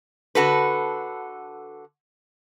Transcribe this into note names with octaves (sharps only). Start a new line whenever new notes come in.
D3 F#4 A4 B4